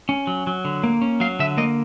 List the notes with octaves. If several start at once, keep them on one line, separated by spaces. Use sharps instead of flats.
C#4
F#3
F#3
D3
A#3
C#4
F#3 F5
D3 E5
A#3 D#5